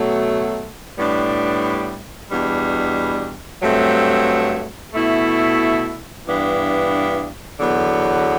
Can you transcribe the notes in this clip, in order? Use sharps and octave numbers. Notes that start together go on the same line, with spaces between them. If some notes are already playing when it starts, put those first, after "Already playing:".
Already playing: B2 F#3 A3
A2 G3 B3 D4
E2 B2 G3 D4
G2 F#3 A3 C4
B2 A3 E4
G2 E3 B3 D4
E2 D3 F#3 B3